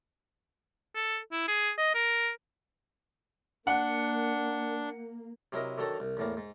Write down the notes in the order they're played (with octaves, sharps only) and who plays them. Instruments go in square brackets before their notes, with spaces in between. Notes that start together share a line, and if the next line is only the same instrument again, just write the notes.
[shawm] A4
E4
G#4
D#5
A#4
[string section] A#3 [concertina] D4 [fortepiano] F#5
[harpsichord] C3 F#3 E4 A#4 D#5
D3 D#3 F#3 A4 A#5
C2
E2 A2 A#3
G#2